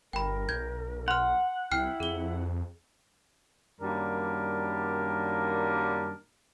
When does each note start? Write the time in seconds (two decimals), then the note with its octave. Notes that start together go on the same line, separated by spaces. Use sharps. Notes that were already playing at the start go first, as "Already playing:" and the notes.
0.13 G1 A#4 G5 B5
0.49 B1 G6 G#6
1.08 F#5 C6 F6
1.72 C2 E4 G5 F6 C7
2.00 F2 G#4 G7
3.80 F#2 D#3 G3 A#3 D4 A#4